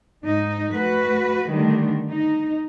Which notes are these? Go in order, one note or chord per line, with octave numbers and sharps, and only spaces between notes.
G#2 D#4
A3 F#4 B4
D3 D#3 G3 A3 D4
D#4